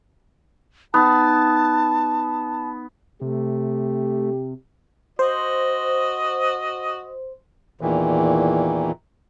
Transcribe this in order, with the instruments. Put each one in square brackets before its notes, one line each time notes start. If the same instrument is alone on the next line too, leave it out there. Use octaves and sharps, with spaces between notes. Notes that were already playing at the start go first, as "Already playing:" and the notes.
[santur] B3 [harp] D#4 [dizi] A5
[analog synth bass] C3 [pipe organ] A3 [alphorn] G4
[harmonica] F#4 D#5 [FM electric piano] C5
[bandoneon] E2 A#2 D#3 E3